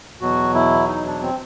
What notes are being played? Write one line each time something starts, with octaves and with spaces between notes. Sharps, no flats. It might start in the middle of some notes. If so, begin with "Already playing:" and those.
E2 B2 F#3 F#4
E4
D#4
D4
C4